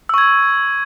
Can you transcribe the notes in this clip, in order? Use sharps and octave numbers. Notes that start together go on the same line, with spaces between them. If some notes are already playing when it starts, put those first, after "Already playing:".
C#6 E6 G#6